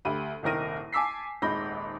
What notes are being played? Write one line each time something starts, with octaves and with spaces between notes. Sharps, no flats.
D2 G4 B5 D#7
D#1 C2 D#3 A#4 A#6 D#7
G#5 A5 D6 E6 B6 C7
D#1 G#1 G#3 B5 G6 A#6